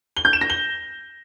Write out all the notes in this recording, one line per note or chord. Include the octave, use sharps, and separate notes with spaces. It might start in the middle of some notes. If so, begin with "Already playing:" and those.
G7
G6
E7
A#6
G7